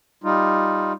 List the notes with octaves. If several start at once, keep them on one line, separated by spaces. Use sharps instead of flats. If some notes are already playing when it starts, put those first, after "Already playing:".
G3 D#4 F4